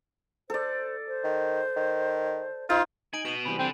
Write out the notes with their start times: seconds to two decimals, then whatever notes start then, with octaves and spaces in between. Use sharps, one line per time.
0.50 A4 C5 D5
1.08 C5
1.24 D#3
1.77 D#3
2.70 D#4 F4 C5
3.13 D#4 G#5 D7 F#7
3.25 F#4 B4 D#7 F#7
3.45 C3 E3 G3 G#5 B5
3.59 D3 C4